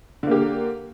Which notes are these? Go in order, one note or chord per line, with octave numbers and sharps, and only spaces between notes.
D3 A#3 G4